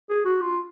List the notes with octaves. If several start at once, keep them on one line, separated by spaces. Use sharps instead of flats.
G#4
F#4
F4